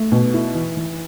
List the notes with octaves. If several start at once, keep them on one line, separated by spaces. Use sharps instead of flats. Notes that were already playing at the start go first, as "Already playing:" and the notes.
Already playing: A3
B2
E4
E3
E3